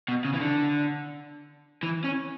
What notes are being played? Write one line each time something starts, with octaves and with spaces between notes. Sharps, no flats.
B2
C#3
E3
D3
E3
C#4